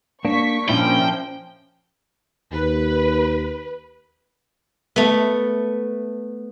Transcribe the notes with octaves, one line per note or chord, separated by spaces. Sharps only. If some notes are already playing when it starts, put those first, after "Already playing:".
A#3 D4 C#6 B6
A#2 F3 A#3 C#4 D4 E4 G5
D#2 B4
A3 B3